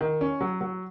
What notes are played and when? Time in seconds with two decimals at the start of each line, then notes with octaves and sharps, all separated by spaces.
0.01 D#3
0.21 C#4
0.41 F#3
0.61 F#3